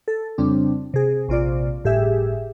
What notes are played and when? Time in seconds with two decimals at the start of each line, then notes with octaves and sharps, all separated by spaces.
0.08 A4
0.38 F2 C#3 G3 C4 D4
0.94 C3 G#4
1.28 A#1 C3 F4 D5
1.84 G1 A2 G4 G#4 E5